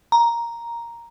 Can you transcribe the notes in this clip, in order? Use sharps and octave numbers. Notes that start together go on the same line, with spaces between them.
A#5